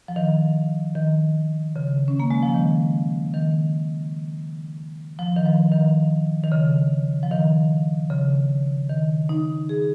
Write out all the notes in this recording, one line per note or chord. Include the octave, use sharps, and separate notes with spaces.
F3
D#3
D#3
C#3
C#4
A#3
G#3
F3
D#3
D#3
F3
D#3
F3
D#3
D#3
C#3
F3
D#3
C#3
D#3
D#4
G#4